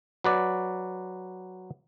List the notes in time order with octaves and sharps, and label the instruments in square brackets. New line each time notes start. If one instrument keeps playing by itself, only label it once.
[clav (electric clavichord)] F#3 B4 D5